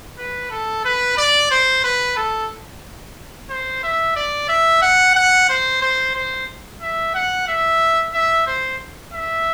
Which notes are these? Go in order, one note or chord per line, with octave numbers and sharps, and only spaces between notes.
B4
A4
B4
D5
C5
B4
A4
C5
E5
D5
E5
F#5
F#5
C5
C5
C5
E5
F#5
E5
E5
C5
E5